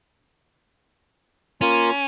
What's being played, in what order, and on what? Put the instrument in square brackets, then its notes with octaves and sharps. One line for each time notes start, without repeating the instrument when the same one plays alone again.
[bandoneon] A#3 F4 [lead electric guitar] C#4